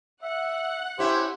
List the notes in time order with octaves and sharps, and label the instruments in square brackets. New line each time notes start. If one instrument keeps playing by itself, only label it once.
[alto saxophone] E5 [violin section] F#5 F#6
[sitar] C#4 E4 [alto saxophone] G4 [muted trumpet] C5